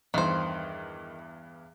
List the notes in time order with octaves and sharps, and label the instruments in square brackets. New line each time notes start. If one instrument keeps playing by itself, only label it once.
[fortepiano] E2 G2 [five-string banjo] D#3 C5